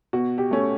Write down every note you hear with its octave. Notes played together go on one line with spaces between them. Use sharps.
B2 F#4
G4
A3 C#4